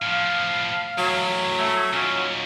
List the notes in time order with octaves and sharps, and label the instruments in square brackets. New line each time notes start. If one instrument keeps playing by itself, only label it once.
[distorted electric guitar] A2 F3 [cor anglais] F5
[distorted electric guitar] F#2 A2 [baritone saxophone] F#3
[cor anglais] A3
[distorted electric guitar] D#2 A#2 [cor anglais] C#4